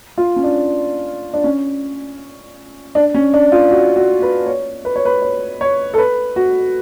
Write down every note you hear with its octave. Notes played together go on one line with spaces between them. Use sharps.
F4
C#4
D4
D4
C#4
D4
C#4
D4
F4
F#4
F#4
B4
C#5
B4
C#5
B4
C#5
C#5
A4
B4
F#4